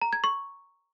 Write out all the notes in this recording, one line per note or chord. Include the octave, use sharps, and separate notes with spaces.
A#5
G#6
C#6